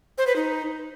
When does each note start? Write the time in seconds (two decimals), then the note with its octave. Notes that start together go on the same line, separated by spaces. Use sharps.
0.18 C5
0.27 B4
0.36 D#4